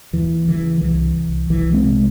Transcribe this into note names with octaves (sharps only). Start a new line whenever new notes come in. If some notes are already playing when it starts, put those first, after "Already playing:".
D#2 E3
C#3 E3
C2 E3
C2
C2 E3
G#3 C4
C3